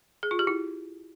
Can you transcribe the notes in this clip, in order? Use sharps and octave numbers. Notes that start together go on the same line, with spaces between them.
G#4
F4
G4
E4